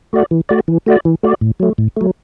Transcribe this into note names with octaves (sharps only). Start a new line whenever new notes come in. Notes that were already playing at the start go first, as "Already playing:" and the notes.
A3 F#4 D5
E3
A3 F#4 D5
E3
A3 F#4 D5
E3
A3 F#4 D5
A2
F#3 A3
A2
F#3 A3